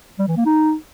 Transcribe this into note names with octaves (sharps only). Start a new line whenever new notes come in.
G3
E3
A#3
D#4